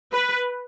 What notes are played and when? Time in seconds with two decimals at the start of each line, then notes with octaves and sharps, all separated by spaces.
0.13 B4